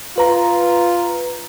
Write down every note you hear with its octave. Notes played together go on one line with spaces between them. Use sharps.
F4 B4 A#5